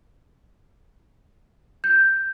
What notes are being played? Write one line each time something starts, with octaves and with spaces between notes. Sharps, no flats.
G6